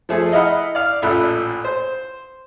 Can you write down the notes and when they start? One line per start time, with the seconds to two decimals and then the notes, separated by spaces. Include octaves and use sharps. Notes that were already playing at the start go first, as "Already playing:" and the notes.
0.09 F3 A3 G#4
0.32 E4 D#5 F5 F#5 B5
0.75 D5 F5
1.02 A1 A#2 A3 B5 E6 F#6
1.64 C5